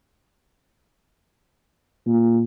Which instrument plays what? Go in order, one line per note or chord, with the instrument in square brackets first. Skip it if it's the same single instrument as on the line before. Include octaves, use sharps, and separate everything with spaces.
[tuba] A#2